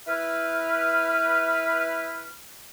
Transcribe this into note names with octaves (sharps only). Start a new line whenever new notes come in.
E4 B4 F6